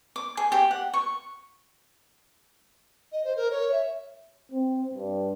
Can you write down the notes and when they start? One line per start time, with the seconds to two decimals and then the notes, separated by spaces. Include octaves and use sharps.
0.16 D6
0.37 G#4
0.52 G4
0.71 F#5
0.94 C#6
3.12 D#5
3.24 C5
3.37 A#4
3.51 C#5
3.72 E5
4.52 C4
4.94 G2